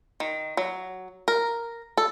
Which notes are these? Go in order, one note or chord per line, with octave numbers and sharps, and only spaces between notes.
D#3
F#3
A#4
A4